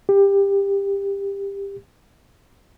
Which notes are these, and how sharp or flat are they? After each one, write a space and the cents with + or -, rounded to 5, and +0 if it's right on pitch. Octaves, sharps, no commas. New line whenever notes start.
G4 +20